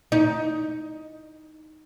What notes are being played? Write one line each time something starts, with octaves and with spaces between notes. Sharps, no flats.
D#4